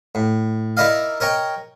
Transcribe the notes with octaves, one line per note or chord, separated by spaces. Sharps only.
A2
D#4 E4 A#4 D5 D#5 F5
A#4 C#5 D#5 G5